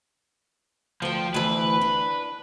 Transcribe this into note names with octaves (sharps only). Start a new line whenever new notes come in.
D2 F3 G5
D2 E3 B4
D4